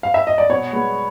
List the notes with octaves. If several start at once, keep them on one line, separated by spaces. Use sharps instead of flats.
F5
E5
D#5
D5
B2 C#5
G#3 B3